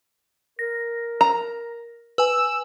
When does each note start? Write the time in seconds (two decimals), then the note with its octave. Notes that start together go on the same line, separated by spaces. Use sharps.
0.59 A#4 A#6
1.21 A#5
2.18 B4 G#5 E6